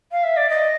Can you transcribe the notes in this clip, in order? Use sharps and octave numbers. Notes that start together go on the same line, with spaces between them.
F5
E5
D5
D#5